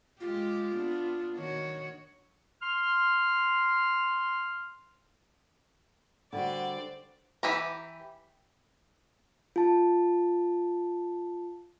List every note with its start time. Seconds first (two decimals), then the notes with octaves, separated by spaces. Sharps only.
0.20 G#3 F4 G4
0.75 B3 D4
1.36 D#3 F#4 C#5
2.62 C6 F6
6.33 D3 G3 F#4 C5 D5
7.43 E3 G4 A#5
9.56 F4 A5